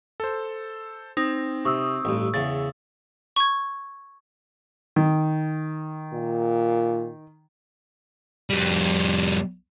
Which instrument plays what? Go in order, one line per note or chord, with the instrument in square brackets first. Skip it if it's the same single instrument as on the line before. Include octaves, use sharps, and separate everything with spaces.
[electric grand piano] A4 C5
[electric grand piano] C4 [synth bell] D#4
[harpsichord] C3 [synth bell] C#6 D#6 E6
[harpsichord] A1 G2
[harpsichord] E2 C#3 [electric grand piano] A6
[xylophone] C#6 G#6
[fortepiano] D#3
[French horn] A#2
[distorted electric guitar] F2 G3